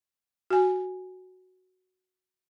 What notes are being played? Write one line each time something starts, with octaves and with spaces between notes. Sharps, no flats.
F#4 G#5